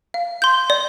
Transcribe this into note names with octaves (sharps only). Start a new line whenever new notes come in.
F5
C6 G6
D5